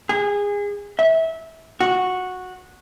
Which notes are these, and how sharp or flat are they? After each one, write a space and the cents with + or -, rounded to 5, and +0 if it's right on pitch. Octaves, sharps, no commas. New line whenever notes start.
G#4 -25
E5 -20
F#4 -10